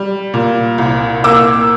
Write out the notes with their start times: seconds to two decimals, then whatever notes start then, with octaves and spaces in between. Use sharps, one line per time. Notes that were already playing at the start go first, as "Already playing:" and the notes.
Already playing: G3
0.34 A#2
0.78 C2
1.24 A#3 D6 E6